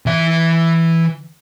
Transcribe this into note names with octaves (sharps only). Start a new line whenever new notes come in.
E3 E5